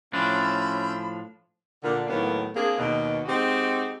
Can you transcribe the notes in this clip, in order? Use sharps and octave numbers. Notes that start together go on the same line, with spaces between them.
A2 F3 C#4 D4 B5 E6 G6
A#2 D3
D#2 A2 F#3 A#3 B3
A#3 C4 D4 G#4
D#2 B2
G#3 C4 D#4 F#4 G4